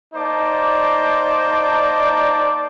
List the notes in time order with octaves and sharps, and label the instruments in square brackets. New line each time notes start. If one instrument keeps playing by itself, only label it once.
[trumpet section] A#3 D#4 C5 D5 A5 D6